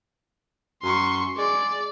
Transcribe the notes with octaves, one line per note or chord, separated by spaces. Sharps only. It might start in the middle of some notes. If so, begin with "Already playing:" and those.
F#2 C6 C#6
G#3 D5